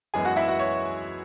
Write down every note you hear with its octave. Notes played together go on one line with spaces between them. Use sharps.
F#2 E3 G#3 B3 G#4 G#5
F#4 F#5
E4 E5
F#4 F#5
C#5 C#6